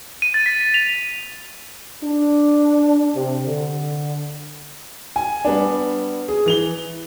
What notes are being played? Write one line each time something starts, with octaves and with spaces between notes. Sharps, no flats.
D#7
A6
B6
F7
D4
C3
D3
G#5
G3 B3 D4
G#4
E3 F7 G7